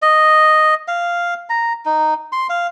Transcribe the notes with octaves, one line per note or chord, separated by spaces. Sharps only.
D#5
F5
A#5
D#4
C6
F5